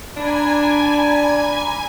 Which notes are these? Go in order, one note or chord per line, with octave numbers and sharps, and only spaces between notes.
D4 D5 G#5 A#5 B5 G#6